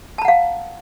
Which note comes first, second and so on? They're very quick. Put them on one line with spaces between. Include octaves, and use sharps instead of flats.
A5 A#5 F#5 F5